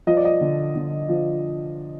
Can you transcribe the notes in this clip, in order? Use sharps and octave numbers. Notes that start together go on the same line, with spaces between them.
F3 D#5
D5
D#5
D3
D3
F3